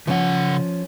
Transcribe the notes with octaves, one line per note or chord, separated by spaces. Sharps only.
C#3 F3 C#4 F#5